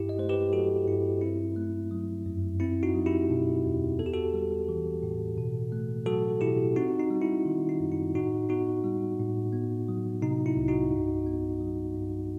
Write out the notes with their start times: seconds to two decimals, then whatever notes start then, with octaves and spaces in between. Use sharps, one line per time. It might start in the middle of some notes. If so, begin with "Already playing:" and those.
Already playing: G2 E4 G4
0.09 D#5
0.18 A3 C5
0.29 G4 B4
0.53 F#3 F#4 A4
0.87 G2 E4
1.21 C4 E4
1.56 A3
1.91 F#3
2.26 F#2
2.60 C4 E4
2.83 D#4 F#4
2.94 F#3
3.06 E4 G4
3.30 B2
3.64 E2
3.99 B3 A4
4.06 G4
4.13 F#4 A4
4.34 G3
4.69 E3
5.03 A2
5.38 B2
5.72 A3
6.06 F#3 F#4 A4
6.41 B2 E4 G4
6.76 C4 D#4 F#4
7.00 D#4
7.10 G3
7.22 E4
7.45 D#3
7.69 D#4
7.80 F#2
7.92 E4
8.14 A2 D#4 F#4
8.49 B3 D#4 F#4
8.84 G3
9.19 A2
9.53 B3
9.88 F#3
10.22 C3 D#4
10.46 E4
10.57 C2
10.68 D#4 F#4
10.92 G2
11.26 B3
11.61 F#3
11.96 G2